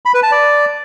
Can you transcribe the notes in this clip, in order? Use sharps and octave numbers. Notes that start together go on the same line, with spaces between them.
B5
B4
A5
D5